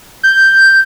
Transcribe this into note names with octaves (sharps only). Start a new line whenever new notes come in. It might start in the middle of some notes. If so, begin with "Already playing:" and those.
G6